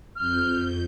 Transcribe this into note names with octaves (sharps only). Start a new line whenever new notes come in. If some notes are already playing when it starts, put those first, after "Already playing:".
F2 F6 G6